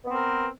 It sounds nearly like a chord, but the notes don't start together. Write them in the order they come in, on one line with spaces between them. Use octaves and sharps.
B3 C4 A#4